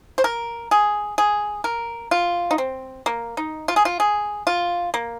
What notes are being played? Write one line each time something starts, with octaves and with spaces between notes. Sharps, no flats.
C5
A#4
G#4
G#4
A#4
F4
D#4
C4
A#3
D#4
F4
G#4
F4
G#4
F4
A#3